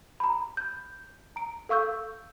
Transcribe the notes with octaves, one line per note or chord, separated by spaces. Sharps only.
A#5 B5
G6
A#5 D7
A4 F5 C#6 E6 G6